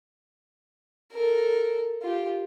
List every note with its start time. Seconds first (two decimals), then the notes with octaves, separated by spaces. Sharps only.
1.13 A4 A#4
2.02 F4 G4